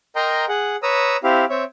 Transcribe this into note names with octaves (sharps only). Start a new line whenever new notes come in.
A#4 D#5 G5 A#5 C6
G#4 F#5
B4 C#5 A#5 D#6 E6
C4 E4 G4 F5
C4 C#5 E5